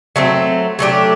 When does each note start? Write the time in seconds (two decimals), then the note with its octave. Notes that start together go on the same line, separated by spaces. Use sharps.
0.16 F#3 A3 C4
0.79 F#3 A3 D4 G4